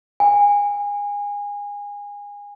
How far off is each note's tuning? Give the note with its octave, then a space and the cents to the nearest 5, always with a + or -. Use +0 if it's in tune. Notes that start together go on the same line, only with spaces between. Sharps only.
G#5 -25